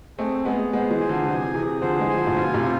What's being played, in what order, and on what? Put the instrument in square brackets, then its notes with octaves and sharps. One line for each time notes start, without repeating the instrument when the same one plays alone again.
[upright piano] A3 C4 [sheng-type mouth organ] G#4
[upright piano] G#3 B3 [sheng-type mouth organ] G#4
[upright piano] G#3 B3 [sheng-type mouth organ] C5
[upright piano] E3 G#3
[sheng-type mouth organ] G#5
[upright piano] D3 F3
[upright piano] C3 E3 [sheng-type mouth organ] G#4
[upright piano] C3 E3 [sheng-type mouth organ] G#4
[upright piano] D3 F3 [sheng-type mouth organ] C5
[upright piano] E3 G#3
[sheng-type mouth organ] G#5
[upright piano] D3 F3
A2
[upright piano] B2 [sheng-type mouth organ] F4
[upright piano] A2 C3
[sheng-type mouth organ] F4